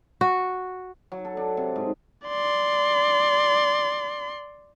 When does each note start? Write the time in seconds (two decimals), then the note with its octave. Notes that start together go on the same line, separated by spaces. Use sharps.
0.21 F#4
1.12 F#3
1.25 A4
1.37 D4
1.57 C3
1.76 G#2
2.27 D5 C6